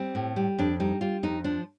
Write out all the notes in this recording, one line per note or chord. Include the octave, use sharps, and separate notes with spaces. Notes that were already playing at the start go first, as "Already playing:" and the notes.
Already playing: G3 C4
A2
G3
F2 D4
G3 D#4
G3 F4
F2 D#4
F3 D4